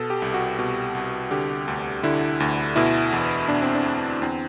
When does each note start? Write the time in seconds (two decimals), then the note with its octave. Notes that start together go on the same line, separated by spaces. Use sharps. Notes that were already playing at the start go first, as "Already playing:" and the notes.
Already playing: B2 A4
0.10 G4
0.22 C2
0.34 F#4
0.59 B2
0.95 C2
1.31 D3 G4
1.68 D2
2.03 D3 E4
2.40 D2
2.76 B2 E4
3.12 E2
3.49 B2 D4
3.62 C4
3.75 D4
3.85 E2
4.22 E2 C4